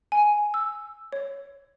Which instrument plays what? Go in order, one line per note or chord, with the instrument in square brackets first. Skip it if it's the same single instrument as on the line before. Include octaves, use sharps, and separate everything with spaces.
[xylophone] G#5
E6
C#5